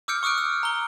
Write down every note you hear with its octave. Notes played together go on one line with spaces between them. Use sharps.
D6 E6 F6 G6 C#7 D7
C#6 D#6 F6 F#6 D7
E6
A#5 G7